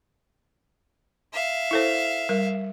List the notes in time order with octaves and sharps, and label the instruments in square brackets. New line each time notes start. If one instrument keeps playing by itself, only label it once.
[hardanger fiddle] E5 F5
[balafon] E4 A4 C5
G3 A#4